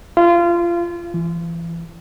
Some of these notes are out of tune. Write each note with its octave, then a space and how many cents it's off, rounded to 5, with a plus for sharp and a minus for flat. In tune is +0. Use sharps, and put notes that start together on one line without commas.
F4 -25
E3 +30